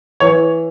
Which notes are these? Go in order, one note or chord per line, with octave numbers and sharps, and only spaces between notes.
E3 C#5